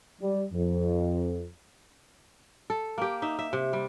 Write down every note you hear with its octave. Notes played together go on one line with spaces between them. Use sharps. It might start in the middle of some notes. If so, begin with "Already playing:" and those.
G3
F2
A4
A#3 G4
D#4 E5
E5
C3
G3